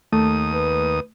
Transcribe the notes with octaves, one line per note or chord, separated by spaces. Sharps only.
D#2 A3 D#6
B4